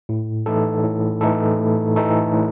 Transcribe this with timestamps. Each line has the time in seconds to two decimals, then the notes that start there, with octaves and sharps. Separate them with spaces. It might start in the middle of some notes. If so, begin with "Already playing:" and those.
0.09 A2
0.46 E3 A3 D#4 A4
0.84 A2
1.21 E3 A3 D#4 A4
1.59 A2
1.96 E3 A3 D#4 A4
2.33 A2